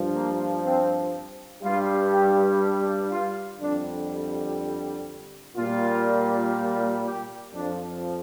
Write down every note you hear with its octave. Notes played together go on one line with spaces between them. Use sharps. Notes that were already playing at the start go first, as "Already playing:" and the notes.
Already playing: G2 F3
A#3
C4
G2 G3 F4
G4
F4
F2 D3 G3 D4
A#2 G3 F4
G4
F2 F3 D4